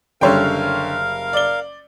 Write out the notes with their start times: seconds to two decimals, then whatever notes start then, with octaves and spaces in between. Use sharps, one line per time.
0.21 F#1 D3 G3 A#4 C#5 F5 G5 C6
1.33 D5 G7